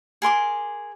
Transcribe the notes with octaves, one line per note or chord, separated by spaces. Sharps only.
G#4 A#4 C6 D6